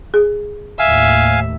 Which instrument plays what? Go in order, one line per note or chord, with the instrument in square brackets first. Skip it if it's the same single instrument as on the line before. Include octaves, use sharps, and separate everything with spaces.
[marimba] G#4
[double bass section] D#2 A2 [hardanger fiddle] E5 [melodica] F5 G#5